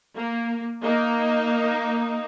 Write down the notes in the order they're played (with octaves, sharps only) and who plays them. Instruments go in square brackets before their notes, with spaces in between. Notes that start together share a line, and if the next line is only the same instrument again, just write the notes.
[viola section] A#3
A#3 D#4